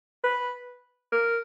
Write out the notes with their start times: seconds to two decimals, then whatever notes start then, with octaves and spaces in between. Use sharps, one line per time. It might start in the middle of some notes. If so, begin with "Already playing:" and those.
0.24 B4
1.12 A#4